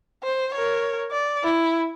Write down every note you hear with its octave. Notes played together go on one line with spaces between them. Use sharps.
C5
A#4 C#5
D5
E4